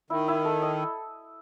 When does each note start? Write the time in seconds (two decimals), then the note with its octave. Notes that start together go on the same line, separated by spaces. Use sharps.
0.10 D#3 E4
0.28 E4
0.45 A4
0.62 D#5